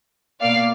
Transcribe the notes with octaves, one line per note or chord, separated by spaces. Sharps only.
B2 A#3 D5 F5